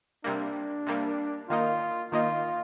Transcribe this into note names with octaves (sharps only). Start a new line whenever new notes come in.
C3 G3 A#3 D4
C3 G3 A#3
D#3 A#3 D#4 F4
D#3 A#3 D#4 F4